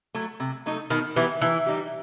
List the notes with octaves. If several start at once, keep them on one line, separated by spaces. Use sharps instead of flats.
F#3 A3
C3
F#3 A3 D#4 A4
B2 D#3
E3 F#3 B3 E4 G4
D#3 E3
G3 D#4 G4